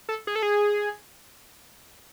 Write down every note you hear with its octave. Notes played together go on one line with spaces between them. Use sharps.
A4
G#4
A4
G#4